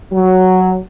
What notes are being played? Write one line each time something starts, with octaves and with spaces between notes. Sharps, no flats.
F#3